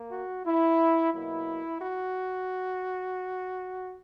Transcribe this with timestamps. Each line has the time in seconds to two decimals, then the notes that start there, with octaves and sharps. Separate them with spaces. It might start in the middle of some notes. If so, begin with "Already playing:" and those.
Already playing: A#3
0.11 F#4
0.46 E4
1.13 B2 F#3 A#3 E4
1.81 F#4